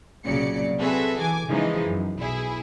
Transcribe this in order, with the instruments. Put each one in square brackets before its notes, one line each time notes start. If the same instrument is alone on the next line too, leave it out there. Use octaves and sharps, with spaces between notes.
[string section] C2 A#2 C#3 F#3 D5 C#7
C4 F#4 G#4 A4 B4 E5
E3 G#5 D6
C#3 E3 F3 G#3 D#4
F#2
B1 E4 G#4